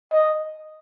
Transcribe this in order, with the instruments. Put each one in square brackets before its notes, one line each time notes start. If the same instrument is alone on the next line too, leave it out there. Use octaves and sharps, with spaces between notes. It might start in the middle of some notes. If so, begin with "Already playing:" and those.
[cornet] D#5